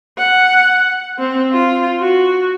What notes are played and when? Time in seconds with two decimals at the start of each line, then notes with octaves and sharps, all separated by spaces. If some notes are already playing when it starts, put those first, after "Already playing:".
0.18 F#5
1.19 C4
1.53 F4
2.00 F#4